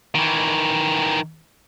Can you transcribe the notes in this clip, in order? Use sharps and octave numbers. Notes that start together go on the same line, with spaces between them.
D#3 E3